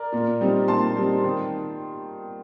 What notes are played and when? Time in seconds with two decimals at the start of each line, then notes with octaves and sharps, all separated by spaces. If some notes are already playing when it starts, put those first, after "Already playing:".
Already playing: A#4 D5
0.12 A#2
0.41 G3 C4 D#4
0.68 A#2 A5 C6
0.96 G3 C4 D#4
1.24 D#3